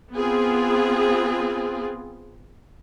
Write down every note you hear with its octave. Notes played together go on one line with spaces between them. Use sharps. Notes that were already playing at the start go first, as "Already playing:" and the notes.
B3 C4 F4 G#4